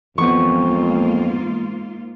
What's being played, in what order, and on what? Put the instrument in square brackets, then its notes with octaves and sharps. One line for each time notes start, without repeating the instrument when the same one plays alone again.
[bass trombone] F2 [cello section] G#2 A#3 F4 [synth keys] E3 B3 [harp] C#6